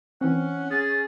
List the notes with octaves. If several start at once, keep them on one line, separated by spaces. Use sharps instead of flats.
E3 C4 C#4 F#5
G#4 A6